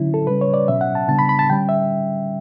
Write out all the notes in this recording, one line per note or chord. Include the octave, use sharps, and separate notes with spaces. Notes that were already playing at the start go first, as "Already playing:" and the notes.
Already playing: D3 F#3 C#4 E4
A4
C#3 G3 C#4 B4
C#5
D5
B2 F#3 C#4 E5
F#5
A5
C#3 G3 B3 D4 A5
B5
B5
A5
D3 G3 C#4 G5
E5